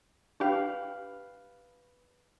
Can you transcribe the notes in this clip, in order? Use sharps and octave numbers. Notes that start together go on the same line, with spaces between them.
D4 G4 B4 F5